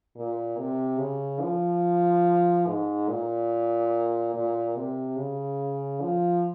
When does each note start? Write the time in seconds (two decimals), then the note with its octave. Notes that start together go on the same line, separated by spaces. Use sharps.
0.16 A#2
0.57 C3
0.99 C#3
1.41 F3
2.67 G#2
3.08 A#2
4.35 A#2
4.76 C3
5.18 C#3
6.02 F3